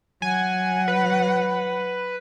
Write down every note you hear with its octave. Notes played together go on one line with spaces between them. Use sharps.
F#3 F#5 G#5
B4